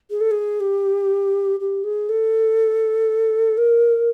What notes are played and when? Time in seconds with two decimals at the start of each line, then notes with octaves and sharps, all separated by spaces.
0.10 G#4
0.20 A4
0.31 G#4
0.60 G4
1.60 G4
1.83 G#4
2.09 A4
3.57 A#4